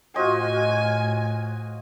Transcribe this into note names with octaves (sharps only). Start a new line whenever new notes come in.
A2 F4 F#4 C5 D#5 G#5